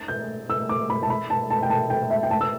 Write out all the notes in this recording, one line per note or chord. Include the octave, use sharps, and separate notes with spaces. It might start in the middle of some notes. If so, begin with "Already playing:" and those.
Already playing: A6
G6
E6
D6
B5
A5
B5
A5
A5
G5
A5
G5
E5
G5
A5
E6